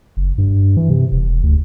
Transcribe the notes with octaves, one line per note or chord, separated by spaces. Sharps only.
F#1
G2
E3
C3
E1
D2